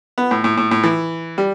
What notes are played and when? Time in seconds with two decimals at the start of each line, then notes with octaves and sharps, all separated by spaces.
0.18 B3
0.31 A2
0.44 A2
0.57 A2
0.71 A2
0.83 E3
1.38 G3